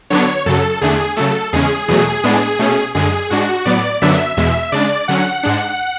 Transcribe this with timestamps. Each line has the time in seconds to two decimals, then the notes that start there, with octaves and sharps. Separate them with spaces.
0.10 D3 F#3 B3 D4 C#5
0.46 F#2 C#3 F#3 A4
0.81 E2 D3 A3 D4 G#4
1.17 C#3 F#3 A3 A4
1.53 E2 C#3 G#3 C#4 G#4
1.88 E2 B2 F#3 A3 G#4
2.24 A2 G#3 B3 D4
2.59 B2 A3 C#4
2.95 F#2 D3 G#3 G#4
3.30 G#2 G#3 D4 F#4
3.65 A2 F#3 B3 D5
4.02 F#2 D3 F#3 B3 D4 E5
4.37 E2 B2 G#3 E5
4.72 C#3 G#3 D4 D5
5.08 D3 F#3 C#4 F#5
5.43 G#2 G#3 D4